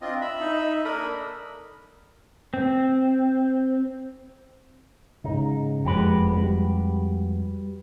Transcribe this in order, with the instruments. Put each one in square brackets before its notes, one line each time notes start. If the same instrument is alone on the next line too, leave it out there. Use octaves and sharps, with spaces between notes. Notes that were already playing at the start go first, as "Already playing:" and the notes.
[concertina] C4 F4 D#5 [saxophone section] D4
[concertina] E5 B5
[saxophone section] D#4
[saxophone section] A#3 D4 A4 [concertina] A#4 B5 D#6
[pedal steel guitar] C4
[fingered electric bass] G#2 C#3 [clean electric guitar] D#4
[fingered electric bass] F#1 F3 [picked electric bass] F2 G#3 [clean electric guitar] F#4 G4 B4
[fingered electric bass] G3